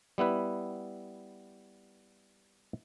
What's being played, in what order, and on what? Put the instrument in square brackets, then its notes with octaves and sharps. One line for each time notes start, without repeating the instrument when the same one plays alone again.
[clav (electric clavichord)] G3 B3 E4 B4